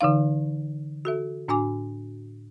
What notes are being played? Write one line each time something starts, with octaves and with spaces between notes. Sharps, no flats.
D3 E3 D#4 F5
F#4 A4 E5
A2 D4 F#4 G#5 D6